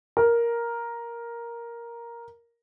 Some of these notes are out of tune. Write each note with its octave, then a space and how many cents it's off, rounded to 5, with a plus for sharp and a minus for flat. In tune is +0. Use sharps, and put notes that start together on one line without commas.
A#4 +5